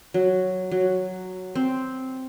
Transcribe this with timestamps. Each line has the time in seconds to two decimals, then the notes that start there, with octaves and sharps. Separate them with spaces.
0.14 F#3
0.71 F#3
1.55 C4